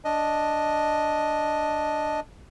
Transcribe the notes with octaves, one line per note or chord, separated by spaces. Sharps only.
D4 D#5